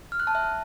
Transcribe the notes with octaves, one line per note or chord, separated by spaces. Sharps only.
F6
F#6
A5
E5